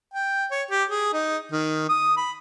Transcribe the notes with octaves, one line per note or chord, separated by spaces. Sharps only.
G5
C#5
G4
G#4
D#4
D#3
D#6
B5